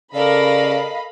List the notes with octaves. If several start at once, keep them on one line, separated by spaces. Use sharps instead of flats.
C#3 A4 A#4 D5 D#5 F5 B5